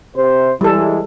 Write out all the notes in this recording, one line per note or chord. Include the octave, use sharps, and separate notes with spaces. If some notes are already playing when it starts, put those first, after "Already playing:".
C3 C5
E3 G3 G#3 A4